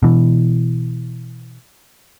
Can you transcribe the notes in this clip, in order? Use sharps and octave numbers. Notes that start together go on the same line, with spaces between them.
B2 E3